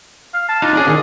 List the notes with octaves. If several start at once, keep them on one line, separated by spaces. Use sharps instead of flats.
F5
A5
D4 D#4 F4 F5
C#4 G#4 D5
D#3 G#4